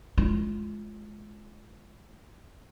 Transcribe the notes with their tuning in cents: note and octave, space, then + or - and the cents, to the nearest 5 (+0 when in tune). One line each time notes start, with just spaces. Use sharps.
G#3 +25 F4 -10